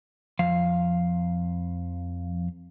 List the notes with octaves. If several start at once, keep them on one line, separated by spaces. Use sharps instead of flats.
F2 F3 F5